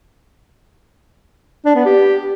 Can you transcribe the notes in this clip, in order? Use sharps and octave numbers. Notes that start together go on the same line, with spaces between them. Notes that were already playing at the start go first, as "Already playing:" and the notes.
D4
B3
G4